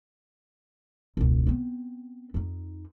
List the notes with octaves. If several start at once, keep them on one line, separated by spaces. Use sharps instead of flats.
E1 C#2
B3 C4
F2 D#4